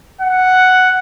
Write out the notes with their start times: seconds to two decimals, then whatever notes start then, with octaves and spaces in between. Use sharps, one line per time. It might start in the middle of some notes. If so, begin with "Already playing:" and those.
0.21 F#5